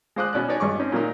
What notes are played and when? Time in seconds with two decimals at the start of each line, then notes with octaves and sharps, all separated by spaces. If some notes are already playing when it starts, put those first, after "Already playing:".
0.16 G#3 F4 C5 D6 D#6 F#6
0.33 B2 C#4 D5 F#6
0.48 D#4 B4 C#5 D5 G#5
0.60 G#1 G2 G#4 C#6 D6
0.79 C4 C#4 D#4
0.92 A#2 F#3 A#3 D#4